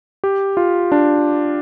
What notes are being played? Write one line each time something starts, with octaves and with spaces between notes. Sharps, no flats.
G4
F4
D4